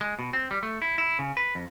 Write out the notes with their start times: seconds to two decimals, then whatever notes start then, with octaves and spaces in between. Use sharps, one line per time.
0.01 G#3
0.19 B2
0.33 C4
0.51 G3
0.63 A3
0.82 E4
0.98 E4
1.19 C#3
1.37 B4
1.55 F2